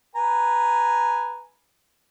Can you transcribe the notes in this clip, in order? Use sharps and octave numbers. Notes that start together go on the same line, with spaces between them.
B4 G#5 A#5